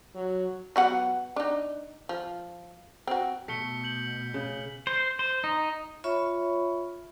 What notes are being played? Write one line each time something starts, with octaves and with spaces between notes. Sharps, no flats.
F#3
F#3 B3 F#5
D4 D#4
F3
C4 F#4
B2 A3 B6 C#7 G7
G6 F#7 G7
C#3
C5
C5
D#4
F4 C#5 E5 B5 C#6